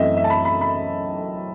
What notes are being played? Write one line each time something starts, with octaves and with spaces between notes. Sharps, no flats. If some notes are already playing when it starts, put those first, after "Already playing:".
Already playing: F#2 E3 A3 C4 D#5 E5
E5
A5
B5
B5
B5